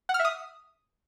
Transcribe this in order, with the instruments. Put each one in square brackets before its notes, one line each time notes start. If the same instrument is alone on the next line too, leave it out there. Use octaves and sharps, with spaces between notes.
[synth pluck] F#5
F6
E5
D#6